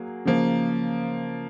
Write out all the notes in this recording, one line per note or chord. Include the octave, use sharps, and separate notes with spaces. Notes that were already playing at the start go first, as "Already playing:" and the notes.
Already playing: F#3 A#3 G#4
C#3 F3 A#3